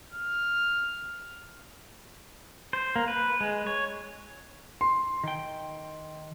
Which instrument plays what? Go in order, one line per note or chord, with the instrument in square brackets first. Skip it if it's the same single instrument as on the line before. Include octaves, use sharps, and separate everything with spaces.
[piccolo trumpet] F6
[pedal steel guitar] C5
A#3
B4
G#3
C#5
[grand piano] C6
[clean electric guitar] D#3 G5